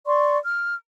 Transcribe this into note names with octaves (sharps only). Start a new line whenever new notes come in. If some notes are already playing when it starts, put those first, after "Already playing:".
D5 C6 C#6
F6